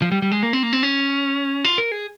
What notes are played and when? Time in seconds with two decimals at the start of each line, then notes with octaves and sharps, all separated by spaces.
0.02 F3
0.12 G3
0.22 G3
0.32 G#3
0.43 A#3
0.53 C4
0.63 A#3
0.73 C4
0.83 C#4
1.65 F4
1.78 A#4
1.92 G#4